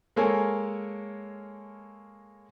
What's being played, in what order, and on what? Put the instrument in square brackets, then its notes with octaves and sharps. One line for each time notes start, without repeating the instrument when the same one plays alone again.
[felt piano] G#3 A#3 A4 A#4 C#5 G#5